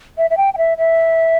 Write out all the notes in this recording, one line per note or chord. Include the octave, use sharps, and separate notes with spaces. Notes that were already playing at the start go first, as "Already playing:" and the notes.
E5
E5
G5
G5
E5
E5